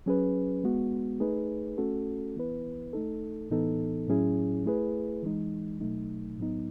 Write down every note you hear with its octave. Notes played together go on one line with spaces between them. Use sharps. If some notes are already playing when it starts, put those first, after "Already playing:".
F#3 C#4 G#4 B4
G#3 B3 F#4
A3 D#4 G#4 B4
A3 C#4 F#4 A4
E3 B3 E4 B4
A3 D#4 A4
A2 E3 B3 D#4 A4
A2 F#3 C#4 E4 G#4
A3 E4 G#4 B4
E3 G#3 D#4
B2 F#3 A3 D#4
A2 F#3 B3 D#4